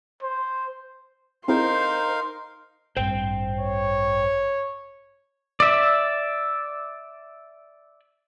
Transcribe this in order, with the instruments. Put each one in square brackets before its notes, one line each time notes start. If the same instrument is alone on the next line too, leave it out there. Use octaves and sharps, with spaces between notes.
[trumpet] C5
[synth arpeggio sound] C4 E4 G#4 [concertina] D#4 A#4 F5 [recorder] C5 [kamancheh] C6
[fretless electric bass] A1 G2 [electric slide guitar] C5 G5
[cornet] C#5
[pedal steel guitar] D5 E5